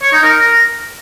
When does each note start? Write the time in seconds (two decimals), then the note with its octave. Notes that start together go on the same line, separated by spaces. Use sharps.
0.02 C#5
0.13 D#4
0.23 A#4